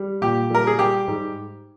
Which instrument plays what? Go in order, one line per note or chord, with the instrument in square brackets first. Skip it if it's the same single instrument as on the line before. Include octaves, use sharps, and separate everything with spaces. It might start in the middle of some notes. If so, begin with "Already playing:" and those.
Already playing: [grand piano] G3
[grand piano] A#2 [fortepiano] G4
[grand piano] G3 [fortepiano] A#4
[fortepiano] G#4
[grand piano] G3 [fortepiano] G4
[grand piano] G#2